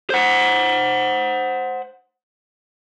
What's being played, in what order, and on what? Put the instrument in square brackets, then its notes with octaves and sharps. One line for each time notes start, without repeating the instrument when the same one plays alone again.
[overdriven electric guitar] C5 F#5